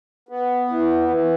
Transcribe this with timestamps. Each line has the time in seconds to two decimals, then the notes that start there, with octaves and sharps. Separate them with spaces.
0.29 B3
0.69 E3
1.08 E3